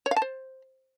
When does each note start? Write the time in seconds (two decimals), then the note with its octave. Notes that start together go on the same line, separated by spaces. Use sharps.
0.06 C#5
0.11 F5
0.16 A5
0.22 C5